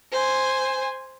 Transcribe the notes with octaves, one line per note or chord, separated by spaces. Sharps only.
C5 G#5